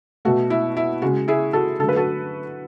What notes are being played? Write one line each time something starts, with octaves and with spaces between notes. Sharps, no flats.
B2 A3 F#4
E4
E4
C#3 G#3 F#4
E4 G#4
F#4 A4
D3 F#3 A3 A4
B4
F#4 A4